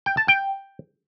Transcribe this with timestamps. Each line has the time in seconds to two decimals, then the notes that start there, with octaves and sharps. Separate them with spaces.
0.06 G5
0.17 A5
0.28 G5